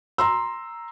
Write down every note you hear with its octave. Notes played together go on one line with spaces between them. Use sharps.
A#5 C6 E6